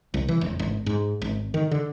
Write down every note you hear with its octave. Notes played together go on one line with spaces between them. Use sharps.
C2
E3
E1
G#1
G#2
G#1
D#3
D3